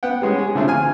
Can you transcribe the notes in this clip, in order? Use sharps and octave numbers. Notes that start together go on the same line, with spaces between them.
B3 F#5 G5
G3 G#3 C#4 G#4
G#4
D3 F3 A3 C4
G#5 F6